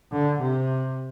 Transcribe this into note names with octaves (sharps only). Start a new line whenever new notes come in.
D3
C3